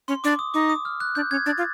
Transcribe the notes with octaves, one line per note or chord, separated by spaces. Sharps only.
C#4 C6
D4 D6
D#6
D#4 D6
D#6
F6
F#6
D4 G6
C#4 G#6
D4 A6
F4